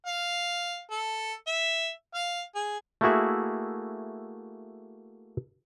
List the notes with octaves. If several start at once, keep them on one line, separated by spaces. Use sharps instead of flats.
F5
A4
E5
F5
G#4
A3 A#3 E4 F#4 G#4 E5